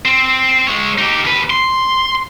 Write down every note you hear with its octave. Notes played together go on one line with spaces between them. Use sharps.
C4
G#3 C#5
D#4 G4
D#2 B4
C6